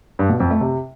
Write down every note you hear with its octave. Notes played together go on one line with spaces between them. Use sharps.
G2
B2
F2
A3
C3